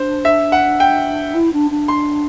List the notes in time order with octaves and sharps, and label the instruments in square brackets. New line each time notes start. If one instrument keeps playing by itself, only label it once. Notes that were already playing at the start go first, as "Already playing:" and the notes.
Already playing: [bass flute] D4 [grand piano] C5
[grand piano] E5
F#5
G5
[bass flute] E4
D4
D4
[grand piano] C6